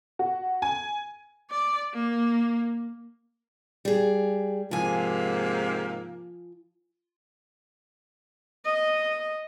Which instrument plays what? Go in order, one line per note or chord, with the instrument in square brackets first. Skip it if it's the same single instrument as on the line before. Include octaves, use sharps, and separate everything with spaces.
[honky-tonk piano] F#4
G#5
[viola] D5
A#3
[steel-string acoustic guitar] G3 G#4
[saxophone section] G#2 C3 A#3 [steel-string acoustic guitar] F3 G#5
[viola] D#5